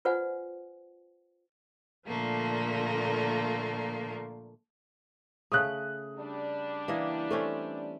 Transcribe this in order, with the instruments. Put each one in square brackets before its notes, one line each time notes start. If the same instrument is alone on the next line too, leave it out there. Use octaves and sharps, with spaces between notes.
[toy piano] F4 B4 C5 D5 F#5 G#5
[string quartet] A#2 D3 F3 A3 A#3
[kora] C#3 A3 [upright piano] D#6 F#6
[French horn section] G3 D4
[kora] E3 A#3 D#5
[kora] A3 C4 C#4 [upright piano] A4